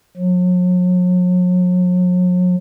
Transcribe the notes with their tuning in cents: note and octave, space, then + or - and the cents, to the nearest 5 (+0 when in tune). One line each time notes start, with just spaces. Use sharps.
F#3 -40